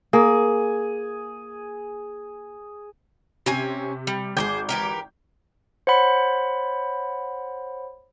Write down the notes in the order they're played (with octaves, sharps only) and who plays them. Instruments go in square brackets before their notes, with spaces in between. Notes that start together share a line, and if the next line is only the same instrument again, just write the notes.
[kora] A#3 [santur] G#4
[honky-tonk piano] C3 [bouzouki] C4 C#4 G#5
[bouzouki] G3
[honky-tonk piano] G#1 D6 G6 [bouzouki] G#4 A#4 C5
[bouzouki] E3 G4 A#4
[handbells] C5 C#5 F#5 B5